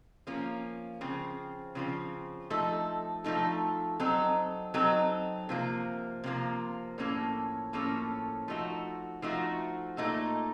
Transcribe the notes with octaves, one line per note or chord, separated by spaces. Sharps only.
F3 A#3 C#4
C#3 F3 C4
C#3 F3 C4
F3 A3 D#4 A4
F3 A3 D#4 A4
F#3 C4 D#4 A4
F#3 C4 D#4 A4
C3 F3 A#3
C3 F3 A#3
A2 F3 A#3 C#4 A4
A2 F3 A#3 C#4 A4
F3 A3 D#4 F#4
F3 A3 D#4 F#4
A#2 A3 D#4 A4